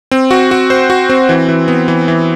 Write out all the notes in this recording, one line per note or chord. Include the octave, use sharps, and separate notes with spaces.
C4
F#4
F#4
C5
F#4
C4
E3
E3
B3
E3
E3